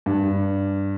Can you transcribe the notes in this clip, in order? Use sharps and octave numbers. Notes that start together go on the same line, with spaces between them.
G2